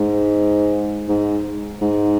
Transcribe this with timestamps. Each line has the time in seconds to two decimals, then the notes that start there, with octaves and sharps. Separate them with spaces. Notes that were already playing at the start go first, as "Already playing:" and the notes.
Already playing: G#2
1.09 G#2
1.81 G#2